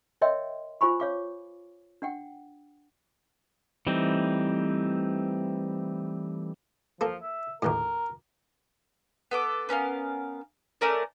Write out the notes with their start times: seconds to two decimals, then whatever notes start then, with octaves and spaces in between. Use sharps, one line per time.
0.21 A#4 C#5 D#5 E5 G5 C6
0.81 F4 C5 G#5 B5 C#6
1.00 C#5 F5 D6
2.02 D4 F#5 G5
3.87 E3 G3 A3 C4 D#4
7.01 F3 A#3 A4
7.22 E5
7.62 A#1 D#2 A2 A#4
9.31 B3 A4 D6
9.69 B3 C#4 A#4 F5
10.81 A3 C#4 A#4 D5